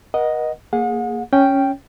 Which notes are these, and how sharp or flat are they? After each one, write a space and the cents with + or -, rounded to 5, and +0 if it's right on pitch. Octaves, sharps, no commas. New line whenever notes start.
A#4 +45 D#5 +0 F#5 +0
A#3 -10 G#4 +0 F#5 -40
C#4 +0 C#5 +0 G5 +0